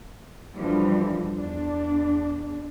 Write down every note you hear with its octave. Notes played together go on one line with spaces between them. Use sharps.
F#2 D3 E3 F3 G3
E2 D4